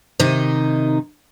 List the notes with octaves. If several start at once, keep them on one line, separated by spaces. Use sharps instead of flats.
C3 D#3 D#4 D#5